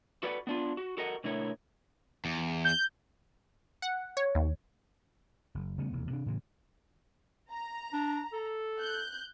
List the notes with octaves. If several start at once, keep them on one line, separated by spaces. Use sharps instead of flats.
F#4 A4 B4 D5 F5 F#5
B3 D4 F4
F#4
F#4 A4 A#4 D#5 F#5
B2 D3 A3 E4 A#4 C#5
E2
G6
F#5
C#5
D#2
F#1
C#3 G3 A3 B3
E1 D#2 C3
C3 D4
A2 C#3 E3
A#5
D4
A4
F#6 G6